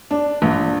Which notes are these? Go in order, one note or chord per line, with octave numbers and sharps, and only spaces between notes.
D4
A#1